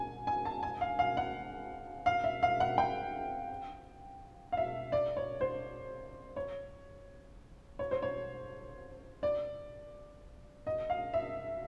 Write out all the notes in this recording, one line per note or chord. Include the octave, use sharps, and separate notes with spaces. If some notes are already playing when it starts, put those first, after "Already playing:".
Already playing: G#5
G#5
A5
G#5
F5
F5
F#5
F5
E5
F5
F#5
G5
F5
E5
D5
C#5
C5
C#5
C#5
C5
C#5
D5
D#5
F5
E5